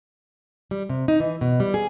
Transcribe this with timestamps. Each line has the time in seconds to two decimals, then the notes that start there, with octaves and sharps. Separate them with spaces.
0.71 G3
0.89 C3
1.08 D#4
1.20 E3
1.41 B2
1.60 G3
1.74 G#4